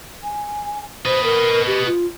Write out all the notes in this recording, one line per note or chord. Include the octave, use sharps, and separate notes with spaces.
G#5
B4 C5 D#5
A#4
G4
F4